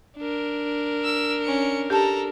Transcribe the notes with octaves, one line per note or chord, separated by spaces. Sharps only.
D4 A#4
E6
C#4 C#7
G4 A4 A5 A#5